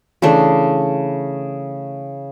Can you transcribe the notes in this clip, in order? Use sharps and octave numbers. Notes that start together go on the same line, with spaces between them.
C#3 E3 A3 D4